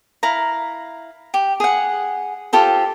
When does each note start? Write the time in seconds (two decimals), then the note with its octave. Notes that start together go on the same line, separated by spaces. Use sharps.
0.23 E4 F5 A#5
1.34 G4
1.60 G#4 F#5
2.53 F4 G4 A4 C5